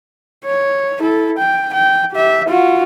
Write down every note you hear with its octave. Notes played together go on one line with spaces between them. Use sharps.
C#5
E4 A4
G5
G5
G4 E5
F4 F#4